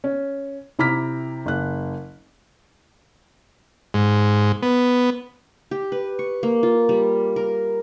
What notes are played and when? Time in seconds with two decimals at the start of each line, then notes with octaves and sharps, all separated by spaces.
0.04 C#4
0.79 C3 E4 A#5 D6 F6 B6
1.46 F#1 F#6
3.94 G#2
4.63 B3
5.71 G4
5.92 B4
6.19 C#6
6.43 A#3
6.63 F4
6.89 G3
7.36 A#4